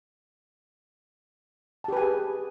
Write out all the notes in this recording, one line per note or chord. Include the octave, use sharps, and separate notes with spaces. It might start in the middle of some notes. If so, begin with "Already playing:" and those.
G4 G#4 B4 G#5 A5